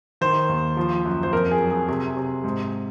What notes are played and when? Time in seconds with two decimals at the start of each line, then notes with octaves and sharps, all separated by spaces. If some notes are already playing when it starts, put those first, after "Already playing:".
0.21 D#3 C5
0.49 D#2
0.77 F3
1.05 F#2
1.23 C5
1.33 F2 A#4
1.51 G#4
1.61 F#3
1.70 G#4
1.88 C3 G#4
2.17 C3
2.44 G#2